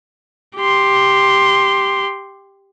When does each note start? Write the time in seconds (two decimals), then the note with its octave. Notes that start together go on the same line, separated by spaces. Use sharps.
0.57 G4 C6